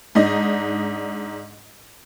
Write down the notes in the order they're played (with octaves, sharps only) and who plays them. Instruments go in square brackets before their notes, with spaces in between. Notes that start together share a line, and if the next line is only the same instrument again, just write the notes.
[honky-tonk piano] G#2 D4 D#4 D#5